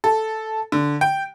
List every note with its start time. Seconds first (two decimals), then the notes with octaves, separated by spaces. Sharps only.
0.04 A4
0.72 D3
1.01 G5